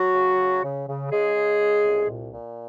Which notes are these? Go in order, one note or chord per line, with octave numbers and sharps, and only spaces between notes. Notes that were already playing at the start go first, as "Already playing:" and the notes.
Already playing: F#3 F#4
C#3
C#3
C#3
C#3
C#3 G#3 G#4
C#3
C#3
C2
A#2
A#2